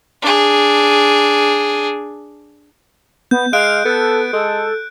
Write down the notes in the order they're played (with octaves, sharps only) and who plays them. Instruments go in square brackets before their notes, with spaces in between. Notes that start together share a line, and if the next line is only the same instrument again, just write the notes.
[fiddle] D4 G#4
[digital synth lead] B3 [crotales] G6
[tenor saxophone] G#3 [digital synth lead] F5 [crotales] F#6 D7
[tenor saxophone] B3 [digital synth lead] A4
[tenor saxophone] G#3 [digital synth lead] A4